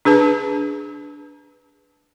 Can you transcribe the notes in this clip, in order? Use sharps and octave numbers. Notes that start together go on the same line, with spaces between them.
D4 G#4 B4 A5